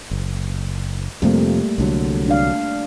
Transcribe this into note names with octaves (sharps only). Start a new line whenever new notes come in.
F#1
F2 C3 F3 G3 A3 A#3
C2 D3 F#3
D4 D5 F5